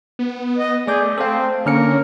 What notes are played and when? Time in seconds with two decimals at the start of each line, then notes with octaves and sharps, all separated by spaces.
0.19 B3
0.58 D#5
0.88 A3 G#4 D5 D6 G6
1.18 C4 A4 F5
1.66 D3 A#3 C#4 A#4 F6 C#7